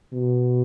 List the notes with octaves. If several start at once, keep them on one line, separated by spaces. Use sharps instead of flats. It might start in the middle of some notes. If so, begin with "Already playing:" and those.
B2